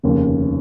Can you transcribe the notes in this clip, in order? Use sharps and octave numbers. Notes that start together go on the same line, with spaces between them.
F1 D#2 C#3